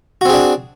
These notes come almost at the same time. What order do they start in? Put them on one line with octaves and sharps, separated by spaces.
F#4 C4 G#4 D4